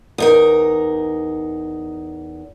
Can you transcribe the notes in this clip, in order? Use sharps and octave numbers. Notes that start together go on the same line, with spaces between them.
E2 D#4 A#4